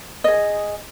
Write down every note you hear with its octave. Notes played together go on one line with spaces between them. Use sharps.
G#4 D#5